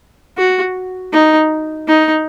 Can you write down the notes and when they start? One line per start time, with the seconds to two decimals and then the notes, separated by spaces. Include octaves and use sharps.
0.38 F#4
1.13 D#4
1.88 D#4